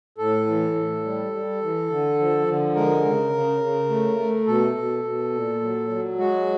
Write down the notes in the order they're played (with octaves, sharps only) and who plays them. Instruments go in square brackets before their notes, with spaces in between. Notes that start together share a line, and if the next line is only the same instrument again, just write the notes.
[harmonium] A2 A4
E3
A2
G3
G3
E3
D3
F3
D3
G#3 A#4
C#3
C#3
C#3
A3
A3
B2 A4
B2
B2
A#2
F#3
F#3
G#3 F#4